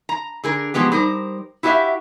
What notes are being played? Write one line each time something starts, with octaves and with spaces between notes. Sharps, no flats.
A#5
D3 G#4 A#4
B2 F3 G#3 B3 G4
G3 D#4 A#4 C5
E4 F#4 G4 D5 E5 F5